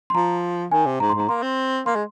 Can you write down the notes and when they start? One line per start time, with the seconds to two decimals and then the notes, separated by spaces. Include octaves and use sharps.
0.10 C6
0.14 F3 A#5
0.71 D#3 G#5
0.86 C3
1.00 G#2 A#5
1.09 C6
1.15 G#2
1.20 A#5
1.29 A#3 C6
1.42 C4
1.86 A#3 C6
1.95 G#3